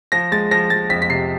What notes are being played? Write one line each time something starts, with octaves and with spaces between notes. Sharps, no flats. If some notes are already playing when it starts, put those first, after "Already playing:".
F3 A#6
G#3 A6
F3 A#6
F3 A6
F2 B6
B6
C3 C7